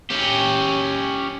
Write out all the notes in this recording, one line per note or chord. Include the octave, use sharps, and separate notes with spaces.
C#4 G4